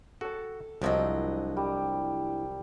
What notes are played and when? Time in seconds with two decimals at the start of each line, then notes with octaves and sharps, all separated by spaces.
0.21 F#4 A4 A5
0.82 C2 F3 F#3 D4 E4 D#5
1.57 G3